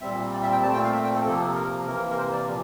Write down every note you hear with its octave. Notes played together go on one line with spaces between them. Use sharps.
A#2 G3 C4 E5
D5
E5
G5
A#2 A3 C4 A5
G5
F5
E5
G5
A4
C3 F3 A#3 A4
A#4
C3 E3 A#3 A#4
A#4
C5
D5
A#2 F3